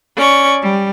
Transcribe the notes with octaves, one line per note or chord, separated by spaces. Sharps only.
C#4 D5 C#6
G3